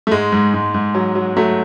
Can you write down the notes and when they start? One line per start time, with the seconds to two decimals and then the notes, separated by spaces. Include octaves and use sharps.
0.07 A3
0.11 G#2 G#3
0.32 G#2
0.54 G#2
0.74 G#2
0.95 F#3
1.15 F#3
1.37 F#3 A3